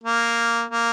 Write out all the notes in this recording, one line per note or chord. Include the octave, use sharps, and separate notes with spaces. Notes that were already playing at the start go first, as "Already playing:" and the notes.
A#3
A#3